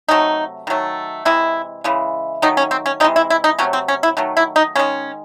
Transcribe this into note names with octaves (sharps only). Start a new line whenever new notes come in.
C3 F#3 A3 D#4
D#3 F#3 A3
C3 E3 G#3 E4
C#3 E3 G#3
D#3 F#3 A3 D#4
C#4
C4
C#4
C3 E3 G#3 D#4
E4
E4
D#4
C3 F#3 A3 C#4
C4
C#4
E4
D#3 F#3 A3
E4
D#4
D#3 G#3 C#4